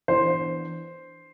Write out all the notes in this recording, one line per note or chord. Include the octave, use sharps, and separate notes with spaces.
E3 B3 D4 C5